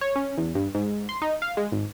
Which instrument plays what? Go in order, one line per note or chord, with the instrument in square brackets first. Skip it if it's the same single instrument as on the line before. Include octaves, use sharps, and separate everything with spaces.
[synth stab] C#5
C#4
E2
G2
G#2
C6
D#4
F5
G#3
G#1